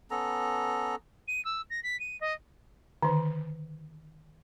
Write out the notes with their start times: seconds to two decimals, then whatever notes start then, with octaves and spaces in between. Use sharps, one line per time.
0.11 B3 C#4 A4 A#5
1.28 D#7
1.45 E6
1.70 A#6
1.83 B6
2.00 D#7
2.20 D#5
3.03 D3 D#3